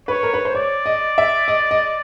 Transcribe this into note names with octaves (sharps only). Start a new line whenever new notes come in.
B4 C#5
A#4
B4
C5
C#5 D5
D#5
E5
D#5
D#5